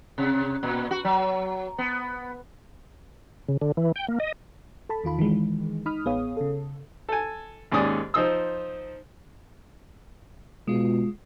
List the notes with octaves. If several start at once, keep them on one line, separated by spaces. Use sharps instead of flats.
C3
A#2
F#4
F#3
B3
C#3
D3
E3
G5
A#3
D#5
A4 A5 B5
E2 D#3 F4 B5
D#3 E3 G#3
D#4 B5 D#6 F6
A1 B3 G#4 C#5 F5 D#6
C#3 A4
A4 G#5
D#2 G#2 C#4 D5 D#6
F3 D#4 C5 D#6 E6
B2 G#3 F4